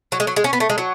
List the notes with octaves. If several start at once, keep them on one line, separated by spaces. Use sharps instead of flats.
F#3
G#3
F#3
G#3
C#4
B3
A3
G#3
F#3